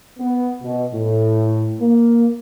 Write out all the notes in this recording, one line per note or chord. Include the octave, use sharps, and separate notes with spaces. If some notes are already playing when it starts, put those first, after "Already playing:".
B3
B2
A2
A#3